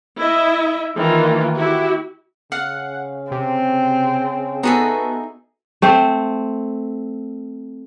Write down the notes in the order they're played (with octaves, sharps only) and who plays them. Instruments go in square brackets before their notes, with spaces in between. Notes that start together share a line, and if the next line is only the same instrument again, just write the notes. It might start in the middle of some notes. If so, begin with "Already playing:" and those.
[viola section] E4 D#5 E5
D#3 E3 A#3 F4
E4 F#4 G4
[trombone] C#3 [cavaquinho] F5 [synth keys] F#5
[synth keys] C3 [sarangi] C4
[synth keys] B3 F#4 A4 [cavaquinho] D#4 G#4 E5
[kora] A3 C4 C5